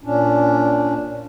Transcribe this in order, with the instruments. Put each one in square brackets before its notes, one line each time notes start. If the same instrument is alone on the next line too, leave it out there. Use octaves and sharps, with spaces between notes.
[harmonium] A#2 C#4 D4